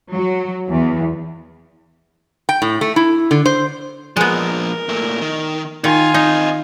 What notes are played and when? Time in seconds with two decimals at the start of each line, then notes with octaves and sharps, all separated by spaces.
0.12 F#3
0.69 E2
2.49 G5
2.62 A2
2.81 A3
2.96 E4
3.31 D3
3.46 C5
4.17 A#2 F3 G#3 B3 A#4
4.89 A#2 A3
5.21 D#3
5.84 D#3 D#4 F4 G#5
6.14 C4 D#4 D#5